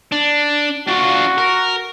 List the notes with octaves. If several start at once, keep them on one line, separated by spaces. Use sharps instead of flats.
D4
D4 F4 F#4
A#4